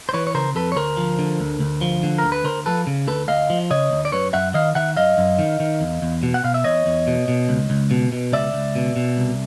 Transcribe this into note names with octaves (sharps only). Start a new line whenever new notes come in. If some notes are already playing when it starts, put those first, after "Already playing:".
C5
E3 B4 C#5
C#5
C#3 A#4 C5
F2 A4 B4
C#5
D2 A#4 C5
F3
D3
D2
D2
F3
D3
A#4
D2
B4
D2 A#4 C5
F3 A4 B4
C#3
D2 A4 B4
D2 D#5 F5
F3
C#3 C#5 D#5
D2
D5
F#2 B4 C#5
F#2 E5 F#5
D#3 D#5 F5
D#3 E5 F#5
F#2 D#5 F5
F#2
D#3
D#3
E2
E2
B2
F#5
B2 F5
E5
E2 C#5 D#5
E2
B2
B2
C#2
C#2
B2
B2
C#2 D5 E5
C#2
B2
B2
C2